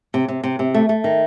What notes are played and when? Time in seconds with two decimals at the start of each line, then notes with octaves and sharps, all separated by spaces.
0.14 C3
0.28 C3
0.43 C3
0.59 C3
0.74 A3
0.89 A3
1.04 D#3